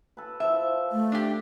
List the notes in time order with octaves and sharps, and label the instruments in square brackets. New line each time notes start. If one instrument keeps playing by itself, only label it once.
[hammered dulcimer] A4 B4
[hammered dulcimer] F3 A4 [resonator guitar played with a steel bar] E5
[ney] A3
[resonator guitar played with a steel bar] D4 G4